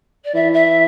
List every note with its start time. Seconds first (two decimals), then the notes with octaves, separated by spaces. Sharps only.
0.24 D5
0.34 E3 E5
0.53 E5